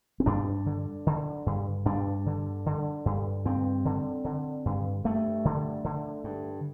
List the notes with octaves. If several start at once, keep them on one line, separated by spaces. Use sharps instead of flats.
C4
G2 D4
D3
D3
G2
G2 D4
D3
D3
G2
G2 C4
D3
D3
G2
G2 A3
D3
D3
G2